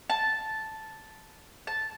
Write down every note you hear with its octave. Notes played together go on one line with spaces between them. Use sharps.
A5
A5